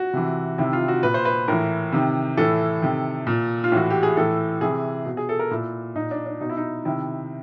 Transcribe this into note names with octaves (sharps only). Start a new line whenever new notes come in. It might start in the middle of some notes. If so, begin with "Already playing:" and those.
Already playing: F#4
C3 E3
C3 D#3 E4
F4
F#4
A#2 B4
C5
B4
A2 E3 A#4
C3 D#3
A2 E3 A4
C3 D#3
A#2
F4
A2 E3 F#4
G4
G#4
A2 E3 A4
C3 E3 G#4
B2
G#4
A4
A#4
A#2 E4
A#2 D#4
D4
D4
B2 D#4
E4
D#4
C3 D#3 E4